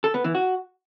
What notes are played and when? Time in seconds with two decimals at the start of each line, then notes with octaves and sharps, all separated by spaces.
0.04 A4
0.14 B3
0.24 E3
0.35 F#4